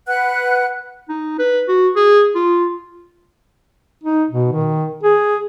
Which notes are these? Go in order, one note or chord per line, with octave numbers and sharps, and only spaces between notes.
B4 F#5 F#6
D#4
B4
F#4
G#4
F4
D#4
B2
D#3
G#4